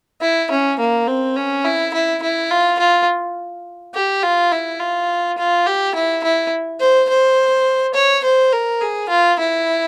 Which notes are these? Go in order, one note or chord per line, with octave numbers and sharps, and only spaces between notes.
E4
C#4
A#3
C4
C#4
E4
E4
E4
F4
F4
G4
F4
E4
F4
F4
G4
E4
E4
C5
C5
C#5
C5
A#4
G#4
F4
E4